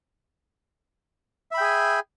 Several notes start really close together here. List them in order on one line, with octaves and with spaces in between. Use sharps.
E5 B5 G5 G#4 G#5